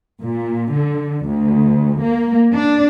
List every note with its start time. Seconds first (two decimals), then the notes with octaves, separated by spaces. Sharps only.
0.21 A#2
0.73 D3
1.27 D2
2.03 A#3
2.50 D4